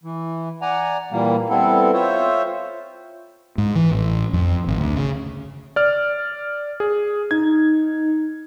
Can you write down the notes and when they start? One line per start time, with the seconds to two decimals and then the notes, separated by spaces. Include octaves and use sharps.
0.04 E3
0.62 D5 F#5 G#5 A#5
1.12 A#2 E3 G3 A#3
1.49 G3 B3 C4 E4 A4
1.93 F4 C5 C#5 E5
3.58 G#2
3.75 E3
3.92 A1
4.33 F2
4.67 G#1
4.78 D2
4.96 C#3
5.76 D5 F6
6.80 G#4
7.31 D#4 G#6